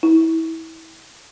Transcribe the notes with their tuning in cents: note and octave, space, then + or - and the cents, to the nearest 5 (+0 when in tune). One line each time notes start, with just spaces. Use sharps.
E4 -25